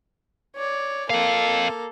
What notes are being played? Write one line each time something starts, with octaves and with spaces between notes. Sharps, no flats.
C#5 D5
A#3 C4 A4 F5